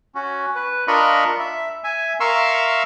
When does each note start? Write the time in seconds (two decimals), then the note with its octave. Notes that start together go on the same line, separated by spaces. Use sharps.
0.15 C#4 F#4
0.55 B4
0.88 D4 F4 A#4 D#5 B5 C#6
1.40 E5
1.84 E5 G#5
2.20 A#4 E5 F5 C6 C#6 E6